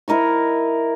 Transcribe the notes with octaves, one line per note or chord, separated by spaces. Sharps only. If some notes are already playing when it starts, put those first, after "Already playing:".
E4 A#4 D#5 C#6